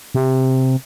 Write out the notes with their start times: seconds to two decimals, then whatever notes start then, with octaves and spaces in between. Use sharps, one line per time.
0.15 C3